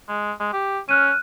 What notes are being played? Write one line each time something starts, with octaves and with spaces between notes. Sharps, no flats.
G#3
G#3
G4
C#4 F6 F#6 D#7